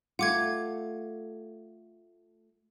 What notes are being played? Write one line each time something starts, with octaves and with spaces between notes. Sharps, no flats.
A3 F4 F#5 D6 G#6